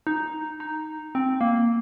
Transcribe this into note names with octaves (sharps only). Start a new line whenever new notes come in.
D#4
D#4
C4
A#3